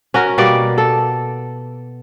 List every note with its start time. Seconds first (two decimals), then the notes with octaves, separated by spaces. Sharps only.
0.14 C#4 F#4 A#4
0.38 B2 G3 A#3 D5
0.78 A4